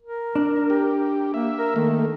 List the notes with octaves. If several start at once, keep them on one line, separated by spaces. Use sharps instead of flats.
A#4
D4
G4
A#3 E5
A#4
D#3 A3 A#3